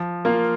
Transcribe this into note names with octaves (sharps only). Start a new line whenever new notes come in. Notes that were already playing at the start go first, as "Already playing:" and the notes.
Already playing: F3
A#3 F4